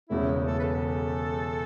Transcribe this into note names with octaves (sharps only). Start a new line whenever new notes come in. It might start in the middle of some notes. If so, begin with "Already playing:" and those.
E1 E2 C#3 E4
A4
B4
A4